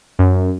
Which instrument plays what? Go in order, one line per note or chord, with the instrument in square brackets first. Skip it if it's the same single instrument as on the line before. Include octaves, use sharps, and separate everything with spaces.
[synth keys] F#2